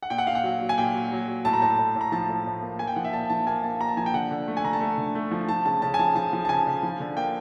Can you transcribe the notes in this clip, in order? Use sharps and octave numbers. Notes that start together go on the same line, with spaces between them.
F#5
A#2 G5
F#5
A#2 F5
F#5
F#3
F#3
G#5
A#2 G5
F#3
F#3
F#3
A2 A5
A#5
A2 A5
A2
A2
A#5
F3 A5
A2
A2
A#3
A#3 G#5
G5
F3 F#5
E5
A#2 A5
F3 A5
A#3 G#5
A#3 A5
A#2 A#5
A5
F3 G#5
G5
D3 F#5
D3
A3
G#5
D3 A#5
A5
A3
D3
A3
F3
F3 A5
C#3 A5
C#3 A5
G#5
F3 A5
F3 A5
F3
A5
C#3 G#5
C#3
F3
D3
A#3 G5